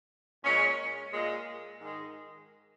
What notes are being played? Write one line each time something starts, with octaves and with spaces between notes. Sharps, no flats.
A#2 G#3 C#4
A#2 G#3
G#2 D#3 G#3